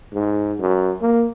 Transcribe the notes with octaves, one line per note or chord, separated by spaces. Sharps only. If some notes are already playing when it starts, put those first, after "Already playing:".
G#2
F#2
A#3